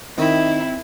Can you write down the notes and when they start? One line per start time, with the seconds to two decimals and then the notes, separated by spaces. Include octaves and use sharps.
0.18 D#3 C4 E4